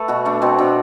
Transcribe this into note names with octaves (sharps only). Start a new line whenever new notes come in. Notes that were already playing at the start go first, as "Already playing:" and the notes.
Already playing: A3 A4 B4
B2 F#4
A3 D4
B2 C4
B2 D4